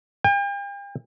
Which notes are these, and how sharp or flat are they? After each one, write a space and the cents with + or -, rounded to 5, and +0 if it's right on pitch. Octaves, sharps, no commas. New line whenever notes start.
G5 +40